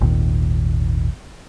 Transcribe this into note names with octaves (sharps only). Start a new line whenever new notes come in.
G#1 D#2 A#2 D#3